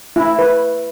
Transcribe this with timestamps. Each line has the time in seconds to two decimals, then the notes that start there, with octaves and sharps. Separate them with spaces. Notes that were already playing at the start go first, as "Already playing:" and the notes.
0.16 E4
0.39 B4